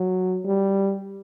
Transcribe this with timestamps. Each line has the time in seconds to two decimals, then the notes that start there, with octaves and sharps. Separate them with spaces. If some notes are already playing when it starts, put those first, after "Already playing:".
Already playing: F#3
0.45 G3